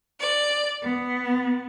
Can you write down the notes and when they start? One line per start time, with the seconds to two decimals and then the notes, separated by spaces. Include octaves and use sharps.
0.20 D5
0.83 B3